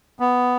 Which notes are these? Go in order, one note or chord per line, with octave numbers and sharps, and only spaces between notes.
B3